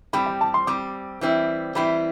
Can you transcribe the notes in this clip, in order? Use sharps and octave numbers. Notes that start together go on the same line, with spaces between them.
G3 C4 G4 B5
G5
A5
C6
G3 C4 G4 D6
E3 G3 C4 E4
E3 G3 C4 E4 B5